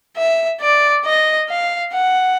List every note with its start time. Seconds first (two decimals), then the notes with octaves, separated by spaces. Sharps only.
0.17 E5
0.61 D5
1.05 D#5
1.49 F5
1.93 F#5